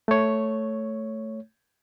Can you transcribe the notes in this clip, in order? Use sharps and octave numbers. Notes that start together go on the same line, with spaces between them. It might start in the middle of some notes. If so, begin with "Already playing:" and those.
A3 C#5